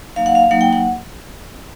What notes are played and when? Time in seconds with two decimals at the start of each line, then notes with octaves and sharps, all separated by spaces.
0.16 F#3 A#3 D#4 F5
0.26 F#5
0.35 F5
0.51 F#3 A#3 D#4 F#5
0.61 G5
0.73 F#5